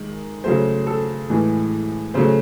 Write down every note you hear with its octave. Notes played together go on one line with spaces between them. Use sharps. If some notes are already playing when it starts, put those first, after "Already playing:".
Already playing: D#3 G#3
C#3 F#3 A3 C5
A4
A2 E3 G#3 G#4
C#3 F#3 A3 C5